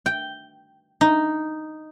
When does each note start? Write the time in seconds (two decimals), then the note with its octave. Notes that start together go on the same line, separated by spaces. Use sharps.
0.06 G5
1.01 D#4